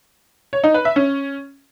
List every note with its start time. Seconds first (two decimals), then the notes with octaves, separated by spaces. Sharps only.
0.53 C#5
0.64 D#4
0.74 B4
0.85 E5
0.96 C#4